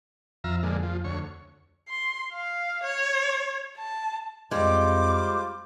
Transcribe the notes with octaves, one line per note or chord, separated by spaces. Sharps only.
F2 F4 E5 A#5
A#2 D3 G#3
F3
D2 C#5
C6
F5
C#5
A5
F2 G3 G#3 F4 C5 D6